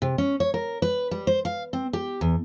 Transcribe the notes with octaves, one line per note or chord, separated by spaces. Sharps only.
C3
C#4
C#5
A#4
B4
G3
C5
F5
C4
G4
E2